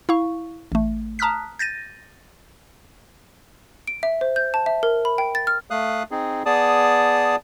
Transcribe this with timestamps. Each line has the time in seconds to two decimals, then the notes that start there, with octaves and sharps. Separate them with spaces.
0.09 E4 F5 C#6
0.72 A1 A3
1.19 A5 A#5 D#6 F6 F#6 B6
1.59 G6 A6 A#6 D#7
3.87 D7
4.03 E5
4.21 C5
4.36 G6
4.54 A5
4.66 E5
4.83 A#4
5.05 B5
5.18 G5
5.35 A6
5.47 F6
5.70 A3 F5 D#6 F#6
6.11 C4 D#4 G#4
6.46 B3 G#4 D5 A5 D#6